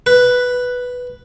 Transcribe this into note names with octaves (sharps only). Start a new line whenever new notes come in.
B4